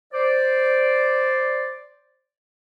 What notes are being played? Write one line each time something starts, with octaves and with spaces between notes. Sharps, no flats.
C5 D5